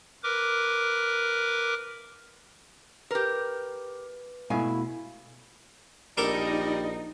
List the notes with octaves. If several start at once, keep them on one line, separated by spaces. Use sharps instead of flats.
A#4 B4 D6
G4 A#4 B4
B2 A3 E4 F#4 F5 G#5
A#1 G3 D#4 A4 A#4 D6